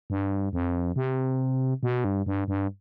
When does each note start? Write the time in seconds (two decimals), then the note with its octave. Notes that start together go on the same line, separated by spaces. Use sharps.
0.10 G2
0.53 F2
0.96 C3
1.83 B2
2.04 G2
2.26 G2
2.48 G2